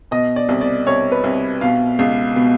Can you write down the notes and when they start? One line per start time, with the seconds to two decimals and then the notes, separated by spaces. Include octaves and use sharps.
0.11 B2 D#5
0.36 D5
0.49 C2
0.61 D5
0.87 C2 C#5
1.12 B4
1.24 C2
1.61 B2 F5
1.99 C#2
2.36 B2